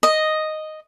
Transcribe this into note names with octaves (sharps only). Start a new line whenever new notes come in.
D#5